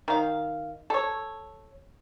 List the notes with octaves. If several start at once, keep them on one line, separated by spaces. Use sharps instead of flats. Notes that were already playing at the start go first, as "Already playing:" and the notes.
D#3 F5
A4 C#5